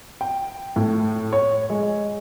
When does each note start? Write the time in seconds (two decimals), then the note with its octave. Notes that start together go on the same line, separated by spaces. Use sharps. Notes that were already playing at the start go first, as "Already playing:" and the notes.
0.21 G5
0.76 A2
1.32 C#5
1.70 G#3